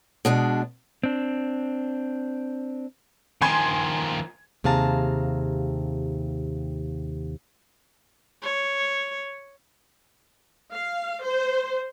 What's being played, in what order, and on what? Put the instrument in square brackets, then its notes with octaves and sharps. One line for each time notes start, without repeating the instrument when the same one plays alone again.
[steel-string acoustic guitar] B2 G#3 D4
[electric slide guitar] C4 D4
[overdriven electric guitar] D#3 F3 [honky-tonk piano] G#5 C6 G#6
[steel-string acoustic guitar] D#2 C3 G#4 F5 A5 A#5
[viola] C#5
[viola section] F5
C5